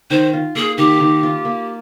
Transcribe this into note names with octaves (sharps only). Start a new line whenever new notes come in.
D#3 C5
F4
A#3 G#4
D#3 G4
D#3
F4
A#3